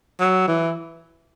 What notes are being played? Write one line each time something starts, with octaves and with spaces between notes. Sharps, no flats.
F#3
E3